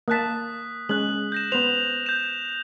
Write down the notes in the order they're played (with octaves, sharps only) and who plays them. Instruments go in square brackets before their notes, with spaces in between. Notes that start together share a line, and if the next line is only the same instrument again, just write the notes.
[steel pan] A#3 A5 [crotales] D#6 F#6 B6
[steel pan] G#3 C#4 [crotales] F#6 F#7
[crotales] G6 A#6 E7
[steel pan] B3 C5 [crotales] F7
[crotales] G6 E7